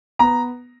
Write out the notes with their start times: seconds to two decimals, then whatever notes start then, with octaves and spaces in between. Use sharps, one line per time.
0.19 B3 A#5